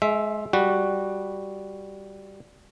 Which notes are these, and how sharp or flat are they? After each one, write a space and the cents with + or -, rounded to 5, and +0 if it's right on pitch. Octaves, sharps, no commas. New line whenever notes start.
G#3 +25 E5 +0
G3 +0 F#4 +0